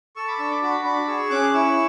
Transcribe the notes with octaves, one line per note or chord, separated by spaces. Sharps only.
A4 C#6 E6
B5 D6
D4 C#6 E6
B5 D6
F#4 B5 D6
D4 B5 D6
G#4 C#6 E6
C#4 D6 F#6
E4 C#6 E6